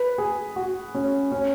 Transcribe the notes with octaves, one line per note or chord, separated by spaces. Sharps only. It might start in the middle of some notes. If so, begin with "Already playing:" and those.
Already playing: B4
G#4
F#4
C#4
C#4